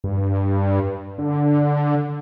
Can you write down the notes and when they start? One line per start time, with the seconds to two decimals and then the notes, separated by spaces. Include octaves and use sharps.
0.04 G2
1.18 D3